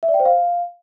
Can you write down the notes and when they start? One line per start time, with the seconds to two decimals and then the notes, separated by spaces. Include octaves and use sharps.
0.03 E5
0.08 D5
0.14 G5
0.20 C5
0.25 F5